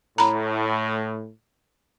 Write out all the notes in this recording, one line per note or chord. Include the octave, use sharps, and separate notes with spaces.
A2 A#5 B5